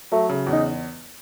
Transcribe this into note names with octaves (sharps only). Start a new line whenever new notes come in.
F#3 A3
C#3
E2
D#4